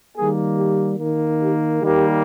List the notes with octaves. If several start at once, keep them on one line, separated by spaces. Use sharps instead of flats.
D#3 G3 A#3 G#4
G4
D#3 A#3
G4
D#3 G3 A#3 G4